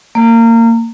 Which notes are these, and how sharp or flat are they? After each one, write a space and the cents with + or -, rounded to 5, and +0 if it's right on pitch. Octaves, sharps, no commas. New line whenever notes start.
A#3 -25